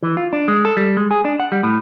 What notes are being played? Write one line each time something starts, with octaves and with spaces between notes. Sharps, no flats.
E3
F4
D4
G#3
A4
G3
G#3
G#4
D4
F#5
G3
A2